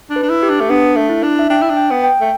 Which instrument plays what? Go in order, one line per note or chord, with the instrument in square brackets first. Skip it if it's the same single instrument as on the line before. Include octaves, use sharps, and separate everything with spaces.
[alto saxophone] D4
[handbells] B4
[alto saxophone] D4
E4
[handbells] G4
[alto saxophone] D4
A3
[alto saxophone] B3 [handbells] D4
[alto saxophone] A3
[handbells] E4
[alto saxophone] D4
[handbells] E5
[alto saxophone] D4 [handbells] G5
[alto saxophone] E4
D4
[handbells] G5
[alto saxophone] B3
[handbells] G5
[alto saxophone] A3